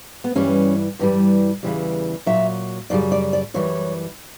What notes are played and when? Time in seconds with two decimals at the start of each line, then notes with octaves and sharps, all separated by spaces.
0.24 B3
0.35 G2 E3 G3 C#4
0.99 G2 E3 G3
1.63 E2 C#3 E3 G3
2.26 A#2 F#3 E5
2.90 F#2 C#3 G3 D5
3.12 D5
3.33 D5
3.54 F#2 E3 G3 C#5